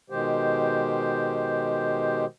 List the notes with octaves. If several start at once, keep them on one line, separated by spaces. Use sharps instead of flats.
B2 D#3 G#3 G4 C5